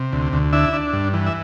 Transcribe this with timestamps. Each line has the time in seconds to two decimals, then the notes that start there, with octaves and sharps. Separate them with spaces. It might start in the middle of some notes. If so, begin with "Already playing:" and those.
Already playing: C3
0.13 D2
0.33 D2
0.53 D4 E4 E5
0.73 D4
0.93 G2
1.14 E3
1.26 E5